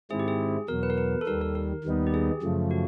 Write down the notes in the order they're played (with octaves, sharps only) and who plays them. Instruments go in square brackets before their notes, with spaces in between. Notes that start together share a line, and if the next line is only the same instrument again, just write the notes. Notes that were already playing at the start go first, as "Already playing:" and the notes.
[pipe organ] G#2 D#3 G#3 C4 E4 [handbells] G#4
[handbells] G4
G#4
[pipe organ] E2 B2 F#3 [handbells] A#4
[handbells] B4
A#4
B4
A4
[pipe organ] D#2 D#3 G3 [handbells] A#4
[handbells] A#4
A#4
[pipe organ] D#2 D#3 G3 B3 D#4
[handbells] G4
G#4
[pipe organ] F#2 C#3 F3 A3
[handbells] F#4